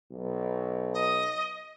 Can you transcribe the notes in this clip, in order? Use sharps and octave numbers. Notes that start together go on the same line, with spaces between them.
B1
D#5